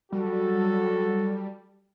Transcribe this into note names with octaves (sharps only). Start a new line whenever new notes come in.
F#3 G3 F#4 A4